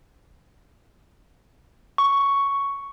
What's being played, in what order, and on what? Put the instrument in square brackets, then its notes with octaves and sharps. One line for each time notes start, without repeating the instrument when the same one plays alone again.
[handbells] C#6